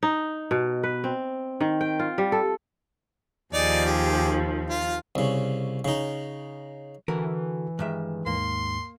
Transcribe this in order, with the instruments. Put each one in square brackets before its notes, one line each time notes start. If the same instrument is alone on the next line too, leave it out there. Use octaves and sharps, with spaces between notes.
[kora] D#4
B2
B4
C4
D#3
G5
F4
G3
A4
[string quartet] D#2 F3 [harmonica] D#4 G#4 D5
[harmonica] G4 G#4
F4 F5
[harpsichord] C2 C#3
C#3 D#4
[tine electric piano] D3 F#4 A4 [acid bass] E3 [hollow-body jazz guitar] A#4
[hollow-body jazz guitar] G2 D#3 E5 [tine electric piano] G#3 G#4
[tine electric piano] D#2 G#2 [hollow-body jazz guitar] A#3 [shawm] C6